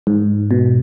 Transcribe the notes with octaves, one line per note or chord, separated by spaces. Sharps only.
G#2
B2